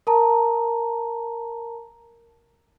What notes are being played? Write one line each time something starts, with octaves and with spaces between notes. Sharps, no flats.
A#4 A5 A#5